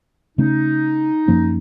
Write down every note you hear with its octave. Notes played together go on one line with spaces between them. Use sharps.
C#3 A3 C#4 D#4
F#2 F3 A#3 C#4